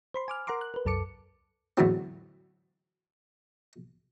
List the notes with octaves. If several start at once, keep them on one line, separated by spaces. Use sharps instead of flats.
C5 B5 C6
G#5 D6 F6
A#4 F#5 A#5 C6 D6
F#6
A#4 B4
C2 F#2 A4 A5 D6 C#7
E2 A2 D3 F#3 C4